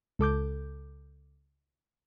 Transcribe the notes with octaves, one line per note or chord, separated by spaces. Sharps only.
C#2 A4 D6 G6